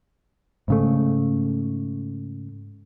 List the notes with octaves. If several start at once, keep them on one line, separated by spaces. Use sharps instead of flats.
G#2 C#3 A3